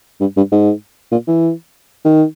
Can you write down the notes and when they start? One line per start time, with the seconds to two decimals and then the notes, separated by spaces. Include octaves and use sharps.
0.21 G2
0.37 G2
0.52 G#2
1.12 A#2
1.27 E3
2.05 D#3